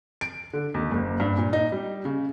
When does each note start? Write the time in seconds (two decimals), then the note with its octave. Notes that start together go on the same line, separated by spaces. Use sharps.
0.21 D7
0.53 D3
0.74 D#2
0.91 F#1
1.20 G2
1.38 A#2
1.53 D#4
1.72 G3
2.05 C#3